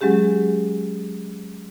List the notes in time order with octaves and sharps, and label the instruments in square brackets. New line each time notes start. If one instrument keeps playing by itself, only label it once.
[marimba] F#3 G#3 C#4 G4 G#4